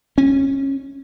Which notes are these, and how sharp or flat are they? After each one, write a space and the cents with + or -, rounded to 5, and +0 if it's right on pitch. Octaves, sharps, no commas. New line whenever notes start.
C#4 -20